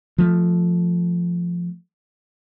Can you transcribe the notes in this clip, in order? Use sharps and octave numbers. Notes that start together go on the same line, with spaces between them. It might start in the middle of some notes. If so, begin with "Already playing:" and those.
F3 A3